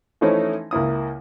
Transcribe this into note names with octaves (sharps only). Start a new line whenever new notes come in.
E3 F3 A3 C#4 D#4 E4
C#2 A#3 E4 D#6